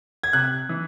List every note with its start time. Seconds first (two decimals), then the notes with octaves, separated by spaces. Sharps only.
0.23 G#6
0.33 C3 F#6
0.69 E3